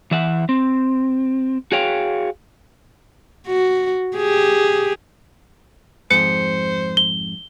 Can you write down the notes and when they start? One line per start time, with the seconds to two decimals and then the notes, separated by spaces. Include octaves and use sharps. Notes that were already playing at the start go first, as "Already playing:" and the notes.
0.11 E3 E5 F#5
0.49 C4
1.72 F#4 G#4 C#5 F5 G5
3.47 F#4
4.17 G4 G#4
6.11 F2 G#2 C5 C#7
6.97 G7